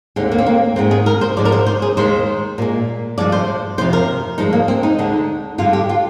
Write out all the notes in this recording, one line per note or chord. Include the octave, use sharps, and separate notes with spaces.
D#2 D3 G#3 C4
A#3
C4
A#3
G#2 D#3 G#3 C4
G#4
A#4
C5
G#2 F3 G#3 D5
A#4
C5
C5
G#4
D#2 D#3 G#3 C5
A#2 G#3
G2 F3 G#3 D5
C5
F2 C3 F3 C5
A#4
G2 F3 G#3 D#4
A#3
C4
D#4
D2 D3 G#3
G2 D3 G#3 F4
G4
F4